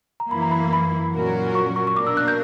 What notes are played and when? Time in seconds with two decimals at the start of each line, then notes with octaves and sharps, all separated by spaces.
0.20 A#5
0.30 F#2 E3 A#3 E4 B5
0.42 A#5
0.51 B5
0.73 B5
1.14 A#2 F#3 C#4 F#4 A#4
1.55 C#6
1.76 C#6
1.87 C#6
1.96 B2 A#3 D4 A#4 D6
2.07 E6
2.17 F#6
2.28 G6